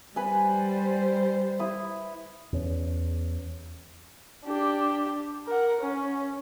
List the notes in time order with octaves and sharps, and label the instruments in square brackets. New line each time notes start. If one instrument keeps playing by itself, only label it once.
[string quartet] G3 C5 [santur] B4 G#5
[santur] E4 D#6
[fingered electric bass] E2 C#4
[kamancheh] D4 G4
A#4 F#5
C#4